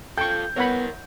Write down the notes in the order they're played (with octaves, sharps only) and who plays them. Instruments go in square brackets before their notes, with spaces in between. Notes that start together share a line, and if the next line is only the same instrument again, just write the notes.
[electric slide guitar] F4 A4 [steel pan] G5 C#6 [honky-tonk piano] G6
[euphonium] B3 [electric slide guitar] E4 A#4 [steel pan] C#5 F#5 B5